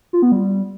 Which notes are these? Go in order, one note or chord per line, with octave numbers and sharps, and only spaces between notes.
F4
B3
G3